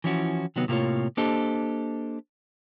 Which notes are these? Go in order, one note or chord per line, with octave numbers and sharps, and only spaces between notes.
E3 F3 C#4 E4 F#4
C3 D#3 F#3 B3
A2 C3 A#3 D#4 F4 C#5
A#3 D4 G4 A4 C5 D#5